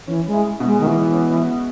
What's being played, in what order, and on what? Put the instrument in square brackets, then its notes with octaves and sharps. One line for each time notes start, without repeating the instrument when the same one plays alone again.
[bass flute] E3 [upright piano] C#4
[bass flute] G#3
[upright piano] E4
B2
[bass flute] G#3
D#3
[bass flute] E3 [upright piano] G#3
[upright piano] C#4
E4